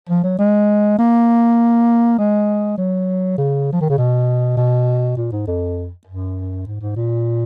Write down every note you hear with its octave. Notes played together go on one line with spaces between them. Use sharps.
F3
F#3
G#3
A#3
G#3
F#3
C#3
F3
D#3
C#3
B2
B2
A#2
G#2
F2
F#2
G#2
G#2
A#2